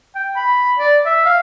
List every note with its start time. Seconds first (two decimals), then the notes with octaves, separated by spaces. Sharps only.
0.15 G5
0.36 B5
0.79 D5
1.06 E5
1.25 F5